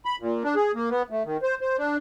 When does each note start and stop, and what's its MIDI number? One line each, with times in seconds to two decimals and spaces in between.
0.05 0.16 83
0.20 0.43 46
0.44 0.55 62
0.56 0.71 68
0.75 0.89 58
0.91 1.03 59
1.10 1.23 57
1.25 1.37 51
1.42 1.55 72
1.61 1.77 72
1.78 1.97 62